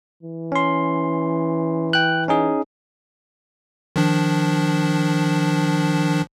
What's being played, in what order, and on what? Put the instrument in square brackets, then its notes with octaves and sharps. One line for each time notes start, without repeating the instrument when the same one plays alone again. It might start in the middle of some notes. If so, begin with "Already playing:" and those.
[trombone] E3
[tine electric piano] C#4 C6
G5 F#6
C#4 D#4 G#4
[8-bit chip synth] D#3 F3 D4